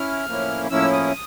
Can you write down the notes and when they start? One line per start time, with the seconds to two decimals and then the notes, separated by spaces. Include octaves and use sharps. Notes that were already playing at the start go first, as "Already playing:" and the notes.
Already playing: C#4 E4 F6
0.26 A2 F3 A#3 C#4 E4
0.70 A2 F3 A#3 C#4 E4 E6
0.93 D#6